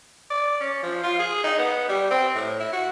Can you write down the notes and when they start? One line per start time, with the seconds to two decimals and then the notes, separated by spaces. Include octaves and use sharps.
0.31 D5
0.61 C#4
0.83 F3
1.03 F4
1.19 G#4
1.44 D#4
1.58 B3
1.89 G3
2.11 C4
2.35 A2
2.60 E4
2.73 F#4